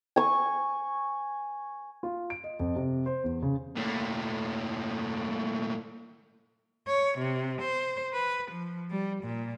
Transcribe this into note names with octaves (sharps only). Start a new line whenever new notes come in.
G#5 C#6
F4
D7
D#5
F2
C3
C5
E2
C#3
A#2 A3
C#5
C3
C5
B4
F3
G3
A#2